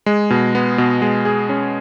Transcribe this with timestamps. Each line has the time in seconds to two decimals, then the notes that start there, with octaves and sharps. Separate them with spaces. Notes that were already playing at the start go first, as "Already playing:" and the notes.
0.06 G#3
0.30 B2
0.55 B3
0.78 B2
1.02 G#3
1.25 G#4
1.49 C#4